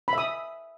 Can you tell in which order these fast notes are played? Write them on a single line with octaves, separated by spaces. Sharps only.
B5 E5 D#6